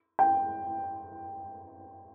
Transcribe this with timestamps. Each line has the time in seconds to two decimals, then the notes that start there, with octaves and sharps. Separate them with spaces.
0.19 G5